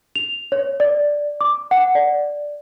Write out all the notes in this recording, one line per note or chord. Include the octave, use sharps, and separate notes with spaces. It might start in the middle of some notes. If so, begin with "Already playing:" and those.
F7
C#5
D5
D6
F#5
D5